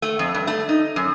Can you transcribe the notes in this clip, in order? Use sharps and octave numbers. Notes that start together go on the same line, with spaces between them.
A3
F2
G2
A3
D#4
F#2